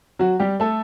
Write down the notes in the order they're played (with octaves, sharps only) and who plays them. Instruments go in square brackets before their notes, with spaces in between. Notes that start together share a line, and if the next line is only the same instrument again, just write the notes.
[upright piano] F#3 F#4
G3 G4
A3 A4